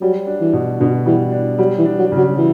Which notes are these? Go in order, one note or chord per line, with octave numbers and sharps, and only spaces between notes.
F#3 G3
D4
E3
B2
B2 D3
E3 G3
D4
F#3 G3
E3
D4
F#3
C#3
F#3
E3